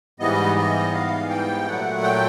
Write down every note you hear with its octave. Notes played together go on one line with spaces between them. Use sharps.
G#2 E3 G3 B3 D#5
D#5
F5
G5
A#2 F#3 A3 F#5
G5